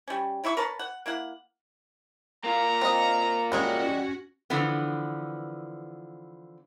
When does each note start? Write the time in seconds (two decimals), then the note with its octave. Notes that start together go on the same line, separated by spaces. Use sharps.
0.08 G3 C#4
0.44 F#3 E4 E5 C#6
0.57 A#4 B4 C#5 A5
0.79 F#5
1.06 A#3 E4 F#5
2.44 A#3 F4 A#5
2.81 C4 D#5
3.52 G3 G#3 C#4 F#4 C#5
4.50 D3 E3 F3 B3